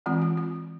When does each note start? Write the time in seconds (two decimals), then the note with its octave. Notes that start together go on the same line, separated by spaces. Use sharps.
0.06 E3 G#3 C4 F4
0.22 F4
0.37 F4